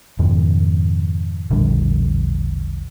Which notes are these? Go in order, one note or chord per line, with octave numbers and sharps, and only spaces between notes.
F2 G#2 B2 D#3
E1 A#1 D3 G3